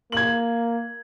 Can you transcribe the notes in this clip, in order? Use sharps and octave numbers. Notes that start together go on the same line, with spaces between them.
A#3 G#6 F#7